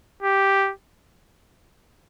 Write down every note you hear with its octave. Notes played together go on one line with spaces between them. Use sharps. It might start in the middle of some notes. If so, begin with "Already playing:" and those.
G4